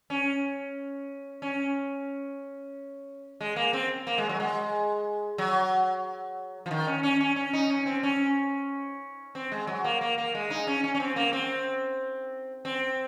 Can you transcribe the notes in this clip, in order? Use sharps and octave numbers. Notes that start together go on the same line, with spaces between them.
C#4
C#4
G#3
A#3
C4
A#3
G#3
F#3
G#3
F#3
F3
D#3
C#4
C#4
C#4
C#4
D#4
C#4
C4
C#4
C4
G#3
F#3
A#3
A#3
A#3
G#3
D#4
C#4
C#4
C#4
C4
A#3
C4
C4